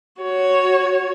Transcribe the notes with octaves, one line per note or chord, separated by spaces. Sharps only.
F#4 C#5